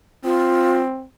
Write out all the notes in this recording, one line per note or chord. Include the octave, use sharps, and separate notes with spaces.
C4 F4